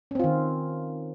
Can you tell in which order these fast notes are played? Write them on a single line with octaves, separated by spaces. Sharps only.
C#4 C4 F4 D#3